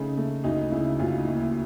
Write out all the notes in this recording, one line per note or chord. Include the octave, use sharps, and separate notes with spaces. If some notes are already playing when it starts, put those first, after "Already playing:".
Already playing: C#3 A3 D#4
A3
D2 D#4
C#3 E4
D2 F4
D#4
D#2 E4